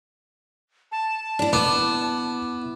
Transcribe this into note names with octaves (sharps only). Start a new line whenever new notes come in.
A5
D4 E4
B3 E4 D6